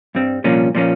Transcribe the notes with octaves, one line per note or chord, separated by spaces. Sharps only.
G2 G3 C4
C2 A#2 F3 A#3 C#4
A#2 F3 A#3 C#4